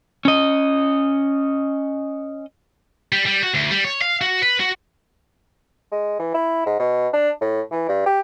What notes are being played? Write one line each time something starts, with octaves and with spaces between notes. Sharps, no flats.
C#4 D#5
G3
G3
F#4
D2
G3
C#5
F5
F#4
B4
F#4
G#3
E3
E4
G#2
B2
D4
A2
E3
G2
G4